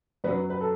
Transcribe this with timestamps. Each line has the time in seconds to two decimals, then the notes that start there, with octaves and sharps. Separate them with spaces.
0.24 F#2 F#3 B3 B4
0.50 B4
0.61 A4